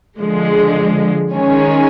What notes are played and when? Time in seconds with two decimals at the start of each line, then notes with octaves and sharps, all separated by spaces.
0.20 D3 F3 G#3
1.33 D#3 G#3 C#4